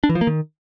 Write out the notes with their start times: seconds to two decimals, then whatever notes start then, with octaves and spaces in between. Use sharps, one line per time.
0.04 D4
0.09 E3
0.15 F3
0.21 A#3
0.27 D#3